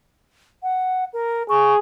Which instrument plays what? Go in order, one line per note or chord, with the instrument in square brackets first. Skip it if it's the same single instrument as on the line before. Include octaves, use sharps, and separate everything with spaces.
[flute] F#5
A#4
[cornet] G#4 [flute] C#6